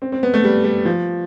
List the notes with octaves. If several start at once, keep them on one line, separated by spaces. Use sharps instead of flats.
C4
C4
B3
A3
G3
G3
F3